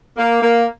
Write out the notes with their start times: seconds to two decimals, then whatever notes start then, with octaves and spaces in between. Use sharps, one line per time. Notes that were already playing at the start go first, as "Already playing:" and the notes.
0.16 A#3
0.42 A#3